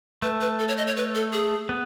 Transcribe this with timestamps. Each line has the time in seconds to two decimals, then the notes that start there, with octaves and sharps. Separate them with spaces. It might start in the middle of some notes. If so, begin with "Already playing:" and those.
0.22 A3 B4
0.41 B4
0.59 A4
0.68 C#5
0.78 D#5
0.87 C#5
0.97 B4
1.15 A4
1.33 G#4
1.69 B3